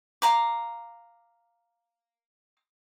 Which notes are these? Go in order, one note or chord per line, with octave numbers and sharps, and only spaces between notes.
F5 A#5 D6